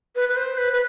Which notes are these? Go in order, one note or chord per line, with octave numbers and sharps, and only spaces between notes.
B4
B4
C5
B4
B4